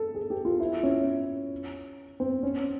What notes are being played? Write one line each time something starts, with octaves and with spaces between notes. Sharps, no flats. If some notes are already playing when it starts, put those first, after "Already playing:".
Already playing: A4
G#4
G4
F4
E4
C#4
C4
C#4